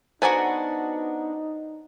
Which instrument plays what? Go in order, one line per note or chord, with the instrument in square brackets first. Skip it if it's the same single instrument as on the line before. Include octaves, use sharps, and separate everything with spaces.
[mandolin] B3 D4 F#4 [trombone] D#4 [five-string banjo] A4 G#5 [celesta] C5 A#5